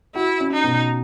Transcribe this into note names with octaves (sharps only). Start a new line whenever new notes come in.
E4 F#4
C#4
D#4
B2